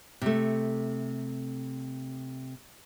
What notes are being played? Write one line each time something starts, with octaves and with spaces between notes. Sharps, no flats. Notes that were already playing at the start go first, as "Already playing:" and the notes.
C3 A3